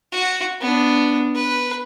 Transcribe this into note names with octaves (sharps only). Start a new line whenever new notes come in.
F#4
B3 D4
B4